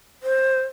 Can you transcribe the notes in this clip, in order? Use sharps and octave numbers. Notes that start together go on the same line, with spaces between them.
C5